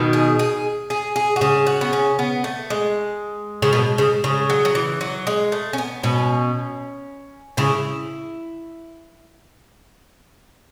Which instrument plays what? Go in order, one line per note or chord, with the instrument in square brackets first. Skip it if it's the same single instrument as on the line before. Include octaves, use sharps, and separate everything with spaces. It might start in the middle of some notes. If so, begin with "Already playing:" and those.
Already playing: [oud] B2 D#3
[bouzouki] G#4
G#4
G#4
G#4
F#4
[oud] C#3 [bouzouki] G#4
[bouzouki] F#4
B3
C#4
B3
A3
G#3
[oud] C#3
B2
C#3
C#3
[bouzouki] F#3
F#3
E3
F#3
G#3
A3
C#4
B3
[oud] B2 [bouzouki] C#4
[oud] C#3 [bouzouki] E4